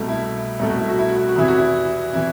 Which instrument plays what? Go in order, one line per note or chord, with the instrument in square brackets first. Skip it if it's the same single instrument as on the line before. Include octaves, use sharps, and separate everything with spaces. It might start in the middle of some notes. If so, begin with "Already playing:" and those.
Already playing: [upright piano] C2 B2 A3
E4
C2 B2 A3 E4
F#4
E4
F#4
E4
F#4
E4
F#4
E2 C3 E3 E4
F#4
E4
C3 E3 E4